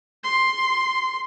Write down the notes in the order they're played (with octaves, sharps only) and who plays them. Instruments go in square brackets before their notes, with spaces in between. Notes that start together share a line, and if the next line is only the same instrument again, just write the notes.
[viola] C6